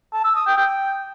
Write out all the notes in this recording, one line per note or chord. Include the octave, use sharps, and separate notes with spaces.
A5
E6
D#6
G5
G5